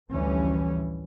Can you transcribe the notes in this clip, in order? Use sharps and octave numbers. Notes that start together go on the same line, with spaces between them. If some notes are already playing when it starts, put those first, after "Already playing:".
A1 D2 E3 F3 G3 C#4